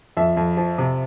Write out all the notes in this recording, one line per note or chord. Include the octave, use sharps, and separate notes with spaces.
F2 E5
F2
F3
C3